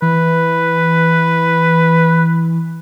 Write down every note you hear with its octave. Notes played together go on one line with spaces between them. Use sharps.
E3 B4